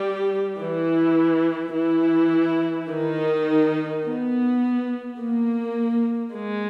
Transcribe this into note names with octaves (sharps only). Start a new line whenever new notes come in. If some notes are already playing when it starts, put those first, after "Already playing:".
Already playing: G3 G4
E3 E4
E3 E4
D#3 D#4
B3
A#3
G#3